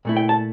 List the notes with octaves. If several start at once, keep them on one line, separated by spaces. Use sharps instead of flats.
A#2 A3 E4
G5
A5